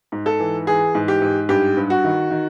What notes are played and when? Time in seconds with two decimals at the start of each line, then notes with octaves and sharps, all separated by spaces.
0.12 G#2
0.26 A4
0.39 E3
0.67 E3 G#4
0.95 G#2
1.08 G4
1.22 G#2
1.49 G2 G4
1.77 G2
1.90 F#4
2.04 D#3
2.31 D#3